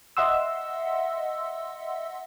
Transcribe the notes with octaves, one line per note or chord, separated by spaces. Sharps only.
D#5 E5 F#5 C6 E6